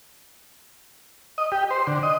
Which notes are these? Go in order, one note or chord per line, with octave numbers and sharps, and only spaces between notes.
D#5
G4
C5
D3
D#5